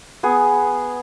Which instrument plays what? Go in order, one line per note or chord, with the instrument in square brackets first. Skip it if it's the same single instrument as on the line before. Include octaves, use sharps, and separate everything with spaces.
[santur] B3 G#4